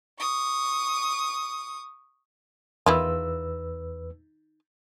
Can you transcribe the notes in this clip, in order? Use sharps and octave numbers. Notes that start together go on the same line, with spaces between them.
C#6 D#6
E2 D#3 E4 F4 B4 E6